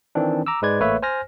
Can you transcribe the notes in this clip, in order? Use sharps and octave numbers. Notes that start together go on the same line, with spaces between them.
D#3 E3 C4 D4
A#5 D6 E6
G#2 G#3 B4 D5 G#6
A1 A3 A#3 B4 C#5 E5
C5 G#5 F6 A#6